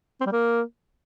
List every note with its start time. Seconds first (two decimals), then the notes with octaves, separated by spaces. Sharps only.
0.21 C4
0.26 G3
0.32 A#3